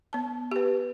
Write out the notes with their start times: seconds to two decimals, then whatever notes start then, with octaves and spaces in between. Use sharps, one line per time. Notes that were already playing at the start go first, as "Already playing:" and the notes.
0.13 B3 A5
0.51 G4 B4